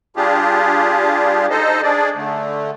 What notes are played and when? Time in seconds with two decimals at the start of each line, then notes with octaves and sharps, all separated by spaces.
0.16 G3 D4 F4 G4 G#4
1.50 D#4 A4 C5 D#5
1.83 D4 G#4 D5
2.16 D3 A3